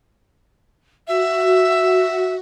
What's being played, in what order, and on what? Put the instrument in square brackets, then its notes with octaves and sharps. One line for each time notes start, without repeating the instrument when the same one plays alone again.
[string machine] F#4 [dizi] E5